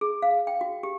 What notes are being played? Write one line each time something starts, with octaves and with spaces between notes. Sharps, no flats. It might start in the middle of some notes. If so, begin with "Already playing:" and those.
G#4
F5
G5
F#4
G4